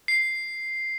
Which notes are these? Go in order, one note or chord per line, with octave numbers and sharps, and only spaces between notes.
C7